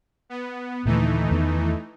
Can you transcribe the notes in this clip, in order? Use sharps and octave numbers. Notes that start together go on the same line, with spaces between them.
B3
D#2 A#2 D3 E3 A3 D#4
E2 D#3 B3